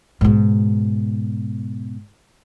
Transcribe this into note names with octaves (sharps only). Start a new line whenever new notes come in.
G#2 B2